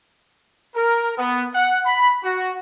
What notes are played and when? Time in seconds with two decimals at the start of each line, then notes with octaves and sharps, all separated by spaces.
0.75 A#4
1.17 B3
1.54 F#5
1.86 B5
2.23 F#4